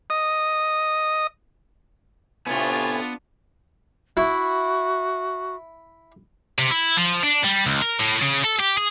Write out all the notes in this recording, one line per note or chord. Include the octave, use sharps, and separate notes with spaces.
D#5 D#6
A2 C3 B3 D4 F4 G#5
E4 F#4
C3
E4
F3
D4
G3
C#2
A#4
A2
C#3
A4
G4
G#4